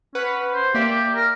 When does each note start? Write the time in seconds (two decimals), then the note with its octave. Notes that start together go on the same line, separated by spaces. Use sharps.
0.15 C#4 B4 F#5
0.54 C5
0.74 A#3 G4 D5 E5
1.16 A#4